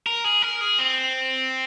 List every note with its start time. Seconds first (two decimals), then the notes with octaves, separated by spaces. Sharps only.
0.06 A#4
0.24 G#4
0.42 A#4
0.61 G#4
0.78 C4